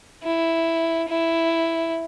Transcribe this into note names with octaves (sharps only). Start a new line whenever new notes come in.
E4
E4